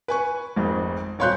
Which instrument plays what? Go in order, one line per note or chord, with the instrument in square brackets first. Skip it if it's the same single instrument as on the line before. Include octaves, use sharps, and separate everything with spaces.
[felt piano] B4 G#5 C#6
G#1 F2 G#2
D#1 C#5 F5 C6 F#6 G6